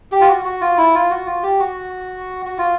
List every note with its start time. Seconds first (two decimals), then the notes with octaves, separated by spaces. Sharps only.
0.12 G4
0.21 F4
0.28 F#4
0.45 F#4
0.61 F4
0.78 E4
0.94 F4
1.10 F#4
1.26 F4
1.43 G4
1.60 F#4
2.46 F#4
2.58 F4